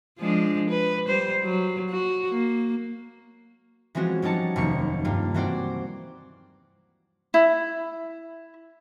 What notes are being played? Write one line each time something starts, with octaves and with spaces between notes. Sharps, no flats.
F3 G#3 D4
B4
G3 C5
F#3
F#4
A#3
E3 F3 G#3 C4 C#4 F#4
F#3 G3 D#4 A5 C#7
F1 D#2 A#3 C#6 C#7
G2 G3 A#3 F4
E3 G3 C4 F#4 C5 D5
E4